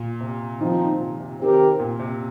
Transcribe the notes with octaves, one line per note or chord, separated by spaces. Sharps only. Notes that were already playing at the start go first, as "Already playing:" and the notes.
Already playing: A#2
C3
A#2 D#3 F3 C4 D#4
C3
C3
D#3 C4 G4 A#4
A#2
C3